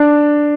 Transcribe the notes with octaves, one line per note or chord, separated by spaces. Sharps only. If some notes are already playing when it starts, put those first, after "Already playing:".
Already playing: D4